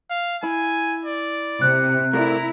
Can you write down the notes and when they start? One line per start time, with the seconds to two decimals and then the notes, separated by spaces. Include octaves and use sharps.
0.10 F5
0.43 E4 G#5
1.06 D5
1.62 C3 F#6
2.13 A3 E4 A#4 D5 A#5